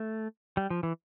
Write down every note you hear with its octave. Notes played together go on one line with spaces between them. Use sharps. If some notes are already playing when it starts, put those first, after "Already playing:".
Already playing: A3
G3
F3
E3